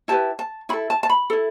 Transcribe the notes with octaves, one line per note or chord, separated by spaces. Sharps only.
E4 G4 B4 A5
A5
E4 A4 B5
A5
A5
B5
E4 A4